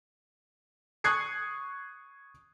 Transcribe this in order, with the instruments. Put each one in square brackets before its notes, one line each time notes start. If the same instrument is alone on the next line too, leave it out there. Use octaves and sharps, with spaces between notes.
[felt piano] C#6 D#6 F#6 G#6 C7 C#7